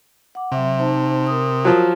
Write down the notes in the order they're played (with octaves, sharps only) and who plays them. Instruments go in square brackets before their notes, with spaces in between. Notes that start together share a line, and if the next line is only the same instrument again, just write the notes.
[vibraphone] F#5 D6
[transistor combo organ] C3 [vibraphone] F#3 E5
[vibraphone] D#4 C5 A5
A#4 D#6
[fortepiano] F3 F#3